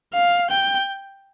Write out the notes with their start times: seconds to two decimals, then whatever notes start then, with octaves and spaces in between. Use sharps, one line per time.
0.14 F5
0.50 G5